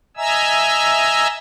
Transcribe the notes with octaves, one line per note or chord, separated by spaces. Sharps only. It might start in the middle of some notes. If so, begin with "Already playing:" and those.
D#5 E5 G#5 A#5 E6